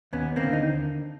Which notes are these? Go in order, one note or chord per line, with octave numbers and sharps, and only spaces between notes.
D#2 B3 C#4
A#3 C4
D3
D#4